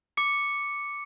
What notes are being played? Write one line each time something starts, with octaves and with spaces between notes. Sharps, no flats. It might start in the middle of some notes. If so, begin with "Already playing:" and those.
D6 C#7